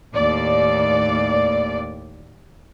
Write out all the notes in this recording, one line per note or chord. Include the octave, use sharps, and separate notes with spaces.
D#2 A2 D5